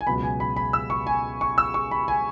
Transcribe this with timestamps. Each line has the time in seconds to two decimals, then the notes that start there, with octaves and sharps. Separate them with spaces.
0.01 G#5
0.07 C#2 B2 F#3 B3 B5
0.23 G#5
0.40 B5
0.57 B5
0.73 E6
0.90 C#6
1.07 G#5
1.41 C#6
1.58 E6
1.74 C#6
1.91 B5
2.08 G#5